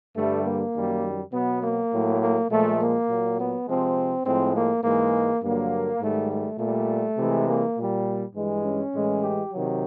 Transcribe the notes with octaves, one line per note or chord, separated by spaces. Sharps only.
G2 D3 G3 A3
A#3
F#2 D#3 G3
B2 F#3 B3
A#3
A2 F#3
A#3
A#2 F3 G#3 A3
A#3
A#2 F#3
B3
C3 F3 G#3 C4
A2 F3 G#3 C4
A#3
G#2 E3 G#3 A#3
G2 D3 F#3 A#3
G#2 D#3 G3 A3
A3
A#2 G3 A3
C3 E3 G#3
A#3
A#2 G3
G2 E3 G#3
C#4
A2 E3 G#3
G4
C3 D#3 F#3